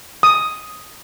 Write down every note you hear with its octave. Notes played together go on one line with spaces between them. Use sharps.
D#6